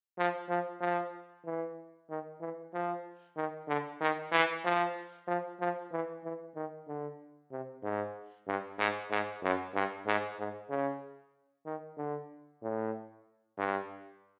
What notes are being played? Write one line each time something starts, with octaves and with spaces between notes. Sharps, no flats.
F3
F3
F3
E3
D#3
E3
F3
D#3
D3
D#3
E3
F3
F3
F3
E3
E3
D#3
D3
C3
G#2
G2
G#2
G#2
F#2
G2
G#2
G#2
C#3
D#3
D3
A2
G2